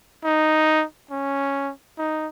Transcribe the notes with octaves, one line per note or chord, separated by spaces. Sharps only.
D#4
C#4
D#4